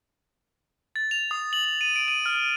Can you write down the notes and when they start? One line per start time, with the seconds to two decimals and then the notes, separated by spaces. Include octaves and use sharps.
0.96 A6
1.11 F7
1.31 D#6
1.53 F#7
1.65 F#7
1.81 D#7
1.96 D7
2.08 D#7
2.26 F6